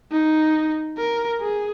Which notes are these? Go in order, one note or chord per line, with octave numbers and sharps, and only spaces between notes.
D#4
A#4
G#4